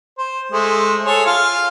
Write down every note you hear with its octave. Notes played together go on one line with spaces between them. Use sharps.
C5
G#3 A3 C5
G#4 A4 C#5
F4 F5